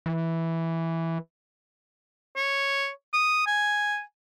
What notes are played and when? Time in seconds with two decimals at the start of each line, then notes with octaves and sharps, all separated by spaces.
0.06 E3
2.36 C#5
3.13 D#6
3.47 G#5